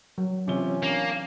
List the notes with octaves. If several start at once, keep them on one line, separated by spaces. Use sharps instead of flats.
F#3
C3 E3 C#4 F4 G7
A#3 D4